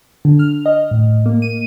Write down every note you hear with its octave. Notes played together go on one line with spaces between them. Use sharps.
D3
F6
D#5
A2
A#3
D#7